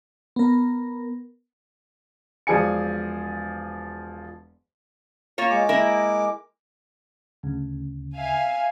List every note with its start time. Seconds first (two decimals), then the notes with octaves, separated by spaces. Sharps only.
0.36 B3 A#4
2.47 E1 F3 G#4 D5 G#5 C#7
5.38 A#3 F4 C#5
5.50 G#3 D6
5.69 A#3 E4 A#4
7.43 D2 C#3
8.16 E5 F5 G#5